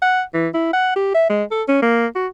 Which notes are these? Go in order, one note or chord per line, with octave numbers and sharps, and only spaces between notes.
F#5
E3
E4
F#5
G4
E5
G#3
A4
C#4
A#3
F#4